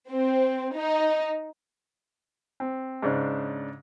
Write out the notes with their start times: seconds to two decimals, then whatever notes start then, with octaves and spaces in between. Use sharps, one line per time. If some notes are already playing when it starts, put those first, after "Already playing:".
0.10 C4
0.75 D#4
2.60 C4
3.02 G#2 C#3 D4